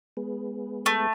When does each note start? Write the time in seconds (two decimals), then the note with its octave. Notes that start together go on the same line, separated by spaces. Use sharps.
0.17 G#3 B3
0.86 A3